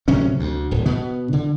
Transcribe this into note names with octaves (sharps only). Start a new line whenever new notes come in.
D1 C3 F#3 C#4
D2
D1
B2 B3
D3